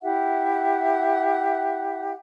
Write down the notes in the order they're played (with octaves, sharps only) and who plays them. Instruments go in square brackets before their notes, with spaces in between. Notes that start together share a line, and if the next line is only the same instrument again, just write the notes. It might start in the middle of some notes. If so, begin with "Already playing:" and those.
[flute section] E4 G4 E5 F#5